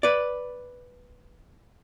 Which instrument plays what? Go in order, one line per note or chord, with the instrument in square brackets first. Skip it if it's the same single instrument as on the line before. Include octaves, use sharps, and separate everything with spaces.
[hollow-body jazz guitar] B4 D5